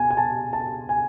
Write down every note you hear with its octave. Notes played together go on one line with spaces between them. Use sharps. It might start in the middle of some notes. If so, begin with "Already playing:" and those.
Already playing: B2 G#5
G#5
A5
A5
G#5